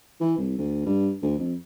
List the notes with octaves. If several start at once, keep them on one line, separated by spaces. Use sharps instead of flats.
E3
C2
D2
G2
D2
F2